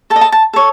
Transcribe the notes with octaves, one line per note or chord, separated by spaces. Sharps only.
A4 A5
D#5
A5
A5
A4 C#5